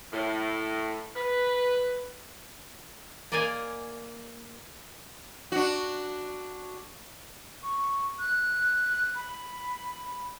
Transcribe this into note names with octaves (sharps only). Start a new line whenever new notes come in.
A2
B4
A#3 D5 D#5 F5 G#5
D4 F#4
C#6
F#6
B5